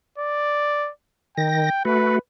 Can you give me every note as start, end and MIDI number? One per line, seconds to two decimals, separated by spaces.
0.18 0.90 74
1.37 1.70 51
1.37 1.81 79
1.37 1.70 94
1.85 2.19 57
1.85 2.19 66
1.85 2.17 71